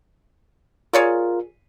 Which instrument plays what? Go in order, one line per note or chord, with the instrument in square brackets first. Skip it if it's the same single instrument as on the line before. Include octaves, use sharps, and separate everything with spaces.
[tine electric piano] F4 A#4 [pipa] G#4 C#5 D5